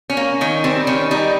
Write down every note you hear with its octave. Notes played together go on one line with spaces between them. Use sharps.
C#4
A#3
D#3 C#4
G3 C4
D#3 C#4
G3 D#4